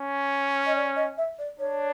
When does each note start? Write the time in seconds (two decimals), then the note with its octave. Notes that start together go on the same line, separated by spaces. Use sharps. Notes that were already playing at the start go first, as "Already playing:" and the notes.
Already playing: C#4
0.66 D#5
0.76 D5
0.96 D#5
1.18 E5
1.39 D5
1.59 D4 C#5